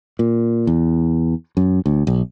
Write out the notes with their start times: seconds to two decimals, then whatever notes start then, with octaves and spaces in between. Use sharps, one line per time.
0.19 A#2
0.67 E2
1.57 F#2
1.86 D2
2.07 B1